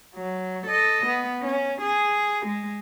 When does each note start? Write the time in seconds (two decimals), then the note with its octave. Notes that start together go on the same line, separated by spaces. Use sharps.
0.15 F#3
0.67 A4 D#5
1.06 B3
1.42 C#4
1.81 G#4
2.46 G#3